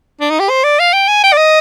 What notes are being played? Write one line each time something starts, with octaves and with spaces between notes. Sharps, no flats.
D4
D#4
G4
C5
D5
F5
G5
G#5
G5
D5
D#5